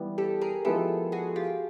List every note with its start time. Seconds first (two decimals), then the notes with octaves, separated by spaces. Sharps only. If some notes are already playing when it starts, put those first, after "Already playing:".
Already playing: E3 G3 B3
0.18 G4 A4
0.41 G#4 A#4
0.65 F3 G#3 B3 E4 G4 A4
1.12 F#4 G#4
1.36 F4 G4